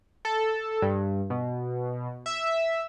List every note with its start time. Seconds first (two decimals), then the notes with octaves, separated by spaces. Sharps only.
0.25 A4
0.82 G2
1.30 B2
2.26 E5